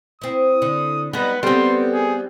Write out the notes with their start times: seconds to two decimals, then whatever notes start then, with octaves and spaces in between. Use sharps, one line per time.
0.21 C4 E4 D#6
0.62 D3
1.13 G3 G#3 B3 D#4 B4
1.43 G3 B3 C4 A4 B4 C6
1.93 G#4